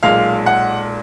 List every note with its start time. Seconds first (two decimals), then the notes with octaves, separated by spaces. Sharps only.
0.03 B1 A#2 G#3 F5
0.46 F#5